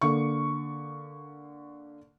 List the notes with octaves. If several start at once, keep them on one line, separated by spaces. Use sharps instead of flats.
D3 A#3 C#6